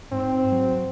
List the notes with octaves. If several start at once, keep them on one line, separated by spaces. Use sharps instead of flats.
G#2 C4
F#3